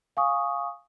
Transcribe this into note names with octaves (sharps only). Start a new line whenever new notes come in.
F5 G#5 C#6 D#6